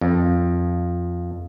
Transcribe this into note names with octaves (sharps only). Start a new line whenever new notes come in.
F2